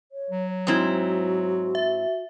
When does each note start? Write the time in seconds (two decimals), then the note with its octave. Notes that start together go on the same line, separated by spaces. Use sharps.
0.12 C#5
0.31 F#3
0.67 G#2 C4 E4 F#4
1.75 E5